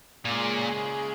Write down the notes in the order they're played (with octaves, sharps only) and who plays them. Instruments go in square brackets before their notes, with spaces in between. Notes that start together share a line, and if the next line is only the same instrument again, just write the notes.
[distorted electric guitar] A#2 [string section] C#3 G#3 C#4 G#4